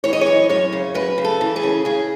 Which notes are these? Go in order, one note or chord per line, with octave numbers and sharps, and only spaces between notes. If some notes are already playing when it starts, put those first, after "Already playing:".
E3 C#5
D#5
C#5
F#2
F#2 C#5
C#3
F#2 B4
C#3
A4
E3
G#4
C#3
C#3 G#4